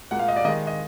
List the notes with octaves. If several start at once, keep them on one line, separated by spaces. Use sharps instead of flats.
A#2 G#3 F#5
F5
D#5
D5
D#3 G#3 D#5
D#5